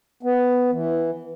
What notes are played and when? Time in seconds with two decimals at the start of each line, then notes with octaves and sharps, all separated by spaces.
0.23 B3
0.72 E3